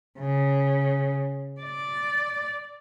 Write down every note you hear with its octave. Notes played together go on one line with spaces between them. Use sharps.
C#3
D5